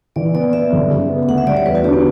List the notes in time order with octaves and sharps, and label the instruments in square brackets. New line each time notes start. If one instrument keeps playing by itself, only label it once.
[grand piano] E3 [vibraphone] D5
[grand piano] B3 [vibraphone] D5
[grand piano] B3 [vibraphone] E5
[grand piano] G1
C#3
B3
[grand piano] D2 [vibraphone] F#5
[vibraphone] E5
[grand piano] G3 [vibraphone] D5
[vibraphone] C#5
[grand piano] E2 [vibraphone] B4
[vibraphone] F#4
[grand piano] D3 [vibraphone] G4
[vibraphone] B3